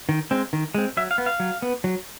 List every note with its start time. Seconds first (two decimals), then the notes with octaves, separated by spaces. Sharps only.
0.09 D#3
0.31 G#3 C4
0.53 D#3
0.75 G#3 C4
0.97 F#3 E5
1.11 F5
1.18 B3
1.26 F5
1.40 F#3
1.62 B3
1.84 F#3